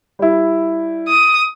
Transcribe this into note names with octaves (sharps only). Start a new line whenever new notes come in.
G3 E4
D#6